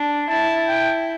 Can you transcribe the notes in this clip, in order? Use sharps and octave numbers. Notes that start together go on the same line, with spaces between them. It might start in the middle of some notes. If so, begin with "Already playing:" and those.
Already playing: D4
E4 A5
G5